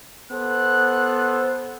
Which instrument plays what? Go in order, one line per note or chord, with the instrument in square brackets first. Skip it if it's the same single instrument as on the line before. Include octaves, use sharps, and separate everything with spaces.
[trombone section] B3 A4 C5 [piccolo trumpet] F#6